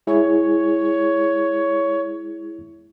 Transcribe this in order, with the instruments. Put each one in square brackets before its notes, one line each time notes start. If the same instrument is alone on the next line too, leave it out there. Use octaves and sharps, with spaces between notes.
[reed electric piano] G#3 E4 G#4 [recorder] C#5